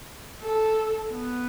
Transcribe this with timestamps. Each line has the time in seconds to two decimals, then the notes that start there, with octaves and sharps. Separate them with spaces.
0.42 A4
1.12 B3